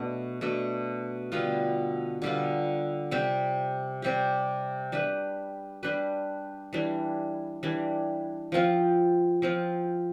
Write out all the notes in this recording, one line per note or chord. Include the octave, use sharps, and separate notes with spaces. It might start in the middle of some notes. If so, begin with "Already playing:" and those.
Already playing: B2 A3 D4
B2 A3 D4
D3 G3 B3 F4
D3 G3 B3 F4
C3 G3 C4 G4
C3 G3 C4 G4
G3 D4 G4 B4
G3 D4 G4 B4
E3 G3 D4
E3 G3 D4
F3 C4 F4
F3 C4 F4